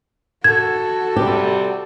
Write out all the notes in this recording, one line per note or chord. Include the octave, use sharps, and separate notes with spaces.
F#4 A4 G#6
C3 G3 G4